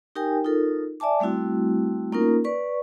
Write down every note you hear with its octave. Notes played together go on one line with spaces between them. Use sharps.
D#4 G4 A#4 G5 G#5
D#4 F4 A4 A#4
D5 E5 G#5 A5 D6
G3 A3 C4 E4 F#4
A#3 C#4 D#4 F4 A#4
B4 D5 C#6